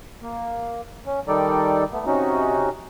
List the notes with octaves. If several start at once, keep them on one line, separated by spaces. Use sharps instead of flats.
A#3
C#4
D#3 G3 D#4 A4 D5
A3 B3
C3 C#4 D#4 F#4